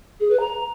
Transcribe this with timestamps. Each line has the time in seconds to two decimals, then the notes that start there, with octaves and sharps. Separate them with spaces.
0.20 G#4
0.30 B4
0.40 A#5